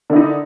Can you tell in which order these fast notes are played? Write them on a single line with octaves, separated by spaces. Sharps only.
D3 E4 D#4